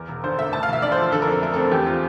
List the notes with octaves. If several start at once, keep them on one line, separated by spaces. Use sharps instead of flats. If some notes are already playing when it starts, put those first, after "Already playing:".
Already playing: E2 A#4
E1
D3 C5
A3 E5
D2 A5
F5
E1 E5
D3 D5
C5
F3
D3 A4
A#4
F2 A4
A3 A#4
C4 A4
E2 G4
F4